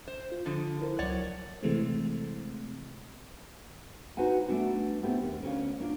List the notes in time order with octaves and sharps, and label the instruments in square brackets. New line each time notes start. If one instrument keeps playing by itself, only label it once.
[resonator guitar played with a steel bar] C5
[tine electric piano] F4
[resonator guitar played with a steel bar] D3 F3
[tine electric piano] E4 A#4 C5
[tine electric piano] C#2 F#3 [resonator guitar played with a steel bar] C#5 D5 F#5
[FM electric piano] C3 E3 G#3 A3 C4
[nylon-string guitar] D#4 F#4 B4 C5 F#5 G#5
A3 B3 C4 D4 F#4
A3 B3 C4 D#4 G4 B4
D#2
D2 C#4 C#5 F5
A#3 D4 F4